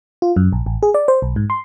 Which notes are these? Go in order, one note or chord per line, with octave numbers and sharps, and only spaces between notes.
F4
F#2
A#1
A1
G#4
D5
C5
B1
G#2
C6